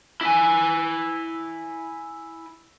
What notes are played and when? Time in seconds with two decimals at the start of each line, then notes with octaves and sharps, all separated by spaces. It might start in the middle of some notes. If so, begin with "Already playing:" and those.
0.21 E4 G#5